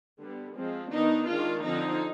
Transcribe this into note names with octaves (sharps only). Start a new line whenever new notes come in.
D3 G3 B3
F3 G#3 C4
D#3 B3 D4 D#4
D#3 G#3 D4 F4
D3 F3 C4 D#4